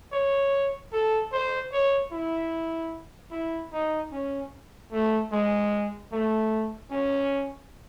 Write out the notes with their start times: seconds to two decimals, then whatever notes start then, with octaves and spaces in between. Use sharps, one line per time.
0.12 C#5
0.92 A4
1.32 C5
1.72 C#5
2.12 E4
3.31 E4
3.72 D#4
4.12 C#4
4.92 A3
5.32 G#3
6.12 A3
6.91 C#4